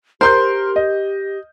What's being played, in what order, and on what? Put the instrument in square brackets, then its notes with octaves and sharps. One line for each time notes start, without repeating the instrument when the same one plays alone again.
[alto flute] G4 [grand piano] A#4 C6 G6 [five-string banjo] C5
[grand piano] D#5